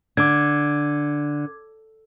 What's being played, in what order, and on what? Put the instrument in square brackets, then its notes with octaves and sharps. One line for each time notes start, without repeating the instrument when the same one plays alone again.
[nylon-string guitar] D3 [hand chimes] D6 G#6